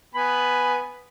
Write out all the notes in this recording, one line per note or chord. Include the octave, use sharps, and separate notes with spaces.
B3 G#5 B5